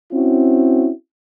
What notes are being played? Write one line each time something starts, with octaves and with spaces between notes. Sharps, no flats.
C4 C#4 E4 F#4